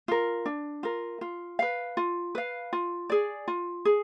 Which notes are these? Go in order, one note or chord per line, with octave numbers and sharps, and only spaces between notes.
F4 A#4
D4
F4 A#4
F4
B4 F5
F4
B4 F5
F4
G#4 D5
F4
G#4